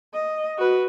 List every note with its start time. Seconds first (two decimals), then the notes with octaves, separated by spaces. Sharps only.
0.14 D#5
0.57 F#4 B4